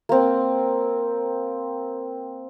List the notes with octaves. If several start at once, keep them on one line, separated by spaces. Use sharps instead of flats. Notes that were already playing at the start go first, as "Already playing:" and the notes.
A#3 C4